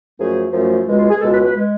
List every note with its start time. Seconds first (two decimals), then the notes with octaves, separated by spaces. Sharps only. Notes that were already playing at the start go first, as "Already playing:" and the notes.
0.19 F#2 F3 A3 G#4
0.53 F#2 F3 A3
0.87 C#2 B2 G#3
0.98 F4
1.10 G#4
1.21 C#2 B2 G#3 A4
1.33 B4
1.44 B4
1.55 G#3